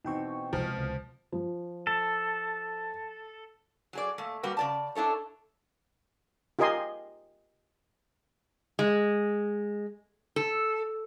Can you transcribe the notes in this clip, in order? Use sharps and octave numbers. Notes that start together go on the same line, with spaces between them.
B2 E3 C4 D#4 G5 C#6
C3 F3 G#3
C#2
F3
A4
F#3 G#4 D5
A#2 A3
G2 G3 A#3 F#4 B4
C#3 D5 A5
D4 E4 A4 C#5
F4 G4 A#4 D#5 G#5 C6
G#3
A4